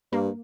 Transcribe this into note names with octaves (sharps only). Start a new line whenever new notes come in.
G2 A#3